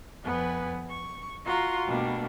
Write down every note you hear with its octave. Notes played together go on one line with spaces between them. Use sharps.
F2 B3 B4 G#5
C#6
F4 F#4 A#5 C6
B2 G3 A3 A#3 D4